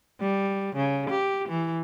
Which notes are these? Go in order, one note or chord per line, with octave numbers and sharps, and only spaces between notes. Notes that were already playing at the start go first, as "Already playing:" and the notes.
G3
C#3
G4
E3